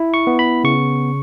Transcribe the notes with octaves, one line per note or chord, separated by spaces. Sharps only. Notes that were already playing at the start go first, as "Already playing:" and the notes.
Already playing: E4
C#6
B3
B5
C#3 C#6